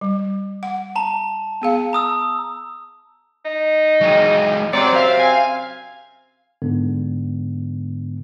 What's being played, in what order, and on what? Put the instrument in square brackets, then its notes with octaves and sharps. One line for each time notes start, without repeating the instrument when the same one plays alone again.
[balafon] G3
F#5
[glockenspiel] A5 A#5
[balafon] B3 G#4 F5
[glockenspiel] A#5 D#6 E6
[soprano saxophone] D#4
[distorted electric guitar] F#3 G#3
[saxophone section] F#2 C3 C4 [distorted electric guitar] C#5 A#5 [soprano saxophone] D5
[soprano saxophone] E5 [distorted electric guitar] F5
[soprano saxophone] G#5
[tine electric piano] G#2 D3 B3